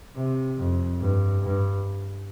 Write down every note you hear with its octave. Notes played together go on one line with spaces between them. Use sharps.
C3
F2
G2
G2